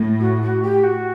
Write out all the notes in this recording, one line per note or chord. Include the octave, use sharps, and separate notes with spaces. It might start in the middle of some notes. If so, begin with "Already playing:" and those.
Already playing: A2
F#4
F#4
G4
F#4